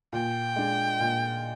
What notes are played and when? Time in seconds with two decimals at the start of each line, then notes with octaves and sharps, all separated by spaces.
0.13 A#2 G5
0.56 G#3 D4
1.00 A#2